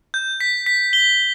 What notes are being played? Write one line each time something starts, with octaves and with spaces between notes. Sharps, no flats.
G6
B6
B6
G7